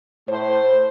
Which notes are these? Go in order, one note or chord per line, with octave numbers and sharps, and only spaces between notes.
A2 A3 C5